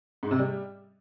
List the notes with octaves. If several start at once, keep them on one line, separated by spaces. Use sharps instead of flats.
G#2
C3
G3